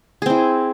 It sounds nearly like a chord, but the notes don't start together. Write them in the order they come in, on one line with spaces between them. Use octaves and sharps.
G#4 C4 E4